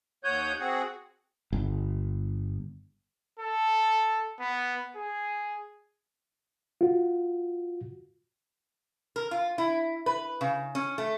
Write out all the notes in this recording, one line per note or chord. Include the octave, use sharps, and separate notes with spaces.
D#2 C#5 F#5 D#6 G6
C4 F#4 G#4 F#5
G1
A4
B3
G#4
F4 F#4
A#4
F4
E4
B4
C#3
C#4
A3